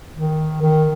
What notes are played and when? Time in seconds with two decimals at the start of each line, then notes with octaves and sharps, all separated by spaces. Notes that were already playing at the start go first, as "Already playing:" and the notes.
0.15 D#3
0.61 D#3